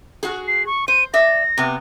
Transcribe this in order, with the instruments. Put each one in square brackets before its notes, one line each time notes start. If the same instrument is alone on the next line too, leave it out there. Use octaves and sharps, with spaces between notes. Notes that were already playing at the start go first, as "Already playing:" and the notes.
[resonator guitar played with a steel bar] F#4 G#4
[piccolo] C7
C#6
[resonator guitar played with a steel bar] C5 [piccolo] D#7
[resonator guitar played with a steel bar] D5 E5 [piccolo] A#6
[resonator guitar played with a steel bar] C3 B3